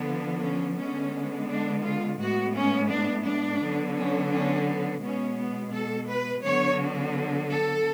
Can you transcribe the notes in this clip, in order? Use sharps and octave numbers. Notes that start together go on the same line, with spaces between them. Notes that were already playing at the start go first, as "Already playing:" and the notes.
Already playing: D3 F3 B3
C#4
D3 G#3 B3 C#4
D4
F4
A2 G#3 B3 F#4
C#4
D4
D4
D3 F#3 B3
C#4
C#4
B3
B2 G#3 B3 C#4
B3
A4
B4
D3 F#3 B3 C#5
A4